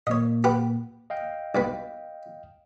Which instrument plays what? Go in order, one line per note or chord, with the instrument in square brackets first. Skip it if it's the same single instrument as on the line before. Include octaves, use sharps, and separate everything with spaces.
[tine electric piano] A#2 A#3 [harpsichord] C#5 D#5
[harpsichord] G4 B4 F#5
[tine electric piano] D#5 F5 G5
[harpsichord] B1 G2 B3